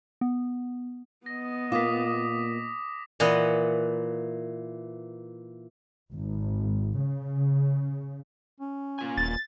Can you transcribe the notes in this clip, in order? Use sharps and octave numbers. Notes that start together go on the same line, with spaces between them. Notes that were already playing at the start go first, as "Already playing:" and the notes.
B3
B3 D#5 A#6
A#2 A#3 F4 D6 D#6 B6
A#2 E3 B4 D#5 F#5
G#1
C#3
C#4
A#3 F4 G#5
D#1 A6